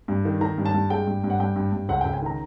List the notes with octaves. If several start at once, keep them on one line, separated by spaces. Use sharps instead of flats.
G2
D#3
D#3 A#5
G2
A5
G2
G#3 G5
G2
G2
F#5
G2 G5
G2
G2
C#2 F#5
C#2 G5
G#5
D#3 A#5